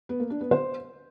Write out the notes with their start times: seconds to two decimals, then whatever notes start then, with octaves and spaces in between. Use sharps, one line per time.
0.09 B3
0.20 A#3
0.30 D4
0.41 B3
0.51 C5